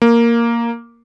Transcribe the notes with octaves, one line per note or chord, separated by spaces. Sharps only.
A#3